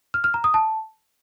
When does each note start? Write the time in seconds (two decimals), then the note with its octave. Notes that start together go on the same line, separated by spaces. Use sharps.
0.14 F6
0.24 F6
0.34 A#5
0.44 D#6
0.54 A5